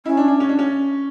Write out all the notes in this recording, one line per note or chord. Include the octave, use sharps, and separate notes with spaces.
C#4 E4
D4
D4
C#4
D4
C#4